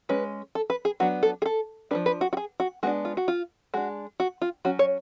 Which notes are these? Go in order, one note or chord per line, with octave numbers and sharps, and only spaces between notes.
G#3 C#4 B4
A4
B4
G#4
F#3 B3 D4 F#4
A4
G#4
A4
F3 A3 D4 B4
B4
F#4
F#4
G#4
F#4
G#3 B3 D4 F#4
F4
F#4
F4
G#3 D4 F#4
F#4
F4
F#3 C#4 F#4
C#5